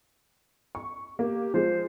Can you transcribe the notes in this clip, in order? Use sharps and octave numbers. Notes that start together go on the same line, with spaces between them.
C#6
A#3 G4
F3 G#3 C5